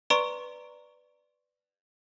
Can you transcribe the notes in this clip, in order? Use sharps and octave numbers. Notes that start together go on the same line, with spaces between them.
B4 D5 A#5 C6 C#6 D7